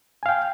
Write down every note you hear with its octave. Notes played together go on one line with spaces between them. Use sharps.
F5 G5 G#5